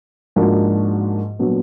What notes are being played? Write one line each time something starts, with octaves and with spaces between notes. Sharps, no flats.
G#2 F3 A#3 D4 F#4
A#2 F#3 B3 D4